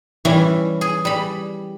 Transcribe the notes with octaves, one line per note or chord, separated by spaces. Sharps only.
E3 G3 C#4 E5
G#4
G3 B5